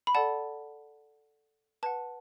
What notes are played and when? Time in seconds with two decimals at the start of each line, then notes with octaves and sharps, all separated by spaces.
0.07 B5
0.15 A4 D5 F#5 A5
1.83 B4 F#5 A5